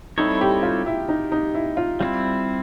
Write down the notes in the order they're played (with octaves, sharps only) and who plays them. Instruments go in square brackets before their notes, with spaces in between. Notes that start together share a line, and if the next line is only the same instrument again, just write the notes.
[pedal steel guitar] G3 C4 E4 A4 C#5 [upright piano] D#4
[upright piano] G4
F4
E4
D#4
D#4
E4
F4
[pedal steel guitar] G3 C4 E4 [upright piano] F4